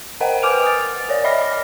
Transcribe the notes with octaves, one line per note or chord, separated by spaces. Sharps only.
A#4 C5 D#5 F#5 G5
B4 G#5 D6 F6 D7 F7
D#6 A6
A#4 C#5 D5
D#5 E5 B5 D6 F6 A#6